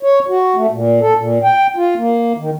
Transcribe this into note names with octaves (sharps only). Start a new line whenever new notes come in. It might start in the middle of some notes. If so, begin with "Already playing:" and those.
C#5
F#4
A3
A#2
A4
A#2
G5
F4
A#3
D#3